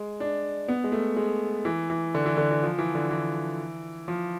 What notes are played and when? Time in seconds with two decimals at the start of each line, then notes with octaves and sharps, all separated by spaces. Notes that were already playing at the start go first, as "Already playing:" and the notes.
Already playing: G#3
0.20 D4
0.68 B3
0.84 G#3
0.92 A3
1.16 G#3
1.65 E3
1.90 E3
2.14 D3
2.26 E3
2.37 D3
2.50 E3
2.63 F3
2.79 E3
2.95 D3
3.11 E3
4.08 F3